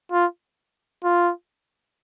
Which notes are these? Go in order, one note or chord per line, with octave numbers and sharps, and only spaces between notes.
F4
F4